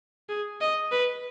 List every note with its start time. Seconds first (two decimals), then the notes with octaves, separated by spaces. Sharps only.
0.29 G#4
0.61 D#5
0.92 B4